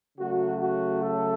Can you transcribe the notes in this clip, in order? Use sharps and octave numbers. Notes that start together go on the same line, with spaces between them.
C#3 F#3 A3 F#4
F#4
A4